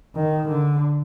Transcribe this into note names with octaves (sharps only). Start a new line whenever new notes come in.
D#3
D3